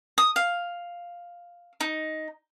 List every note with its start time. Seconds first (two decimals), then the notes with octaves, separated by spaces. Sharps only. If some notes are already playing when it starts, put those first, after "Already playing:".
0.18 D#6
0.36 F5
1.81 D#4